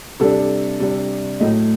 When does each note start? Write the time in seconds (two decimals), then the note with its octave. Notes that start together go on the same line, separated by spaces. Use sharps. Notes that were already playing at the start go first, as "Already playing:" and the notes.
0.20 C3 G3 D4 A4
0.80 C3 G3 D4
1.40 A2 F#3 A3 D#5